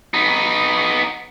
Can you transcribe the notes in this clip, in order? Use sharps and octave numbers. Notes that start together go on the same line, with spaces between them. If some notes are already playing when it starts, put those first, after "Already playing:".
B3 D#4